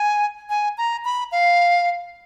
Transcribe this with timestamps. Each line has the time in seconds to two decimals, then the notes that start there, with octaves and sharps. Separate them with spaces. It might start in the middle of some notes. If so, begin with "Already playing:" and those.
Already playing: G#5
0.50 G#5
0.78 A#5
1.05 B5
1.32 F5